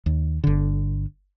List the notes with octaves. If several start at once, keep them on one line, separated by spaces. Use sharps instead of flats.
D#2
G1 D3